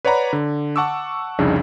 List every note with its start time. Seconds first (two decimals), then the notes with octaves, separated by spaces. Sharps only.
0.05 B4 C#5 D5 F#5 A#5 B5
0.33 D3
0.76 F#5 A5 C#6 D6 E6
1.39 C2 F2 C#3 D4 D#4 G#4